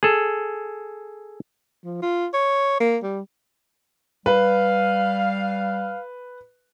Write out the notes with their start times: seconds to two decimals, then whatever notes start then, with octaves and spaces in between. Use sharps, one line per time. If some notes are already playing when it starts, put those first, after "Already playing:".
0.03 G#4 A4
1.84 F3
2.02 F4
2.34 C#5
2.80 A#3
3.03 G3
4.26 G3 B4 F5